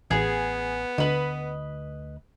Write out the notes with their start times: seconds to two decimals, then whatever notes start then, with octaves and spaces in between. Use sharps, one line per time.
0.11 A1 B3 G#4
0.98 D2 B4 D#5